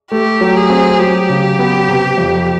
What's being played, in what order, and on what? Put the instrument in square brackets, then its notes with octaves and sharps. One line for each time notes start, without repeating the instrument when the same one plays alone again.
[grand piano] A3 [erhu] G4
[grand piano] F#3
[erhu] G#4
[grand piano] C4
[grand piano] F#3 [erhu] G4
[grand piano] C#3
B3
C3
F2